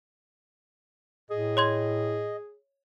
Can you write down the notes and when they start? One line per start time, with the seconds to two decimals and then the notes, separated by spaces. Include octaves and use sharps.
1.30 A2 G#4 D#5
1.57 C#5 C6 G#6